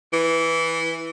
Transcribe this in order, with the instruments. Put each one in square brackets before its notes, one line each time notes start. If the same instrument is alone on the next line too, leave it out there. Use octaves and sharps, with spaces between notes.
[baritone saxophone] E3